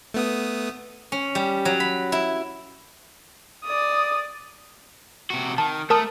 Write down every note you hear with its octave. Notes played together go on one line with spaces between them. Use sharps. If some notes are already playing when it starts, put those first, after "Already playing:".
A3 B3 D#6
C#4
G3
F#3
B5
E4
D5 D#6
C3 F#4
D#3 A5
A3 A#4 A5 D#6